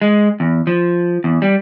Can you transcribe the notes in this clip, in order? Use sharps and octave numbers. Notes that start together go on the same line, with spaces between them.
G#3
E2
F3
E2
G3